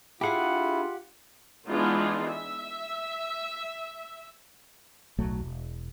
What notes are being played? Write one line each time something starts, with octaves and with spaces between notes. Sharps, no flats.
D4 E4 F4 G4 G#4 F5 F#5
E3 G#3 B3 D4 D#4 F4
E5
D1 B1 F#3 A3
E1